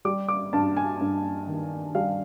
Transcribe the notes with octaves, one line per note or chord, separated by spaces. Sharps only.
G3 D6
D6
G2 A5
G#5
G2
D#3
G3 F5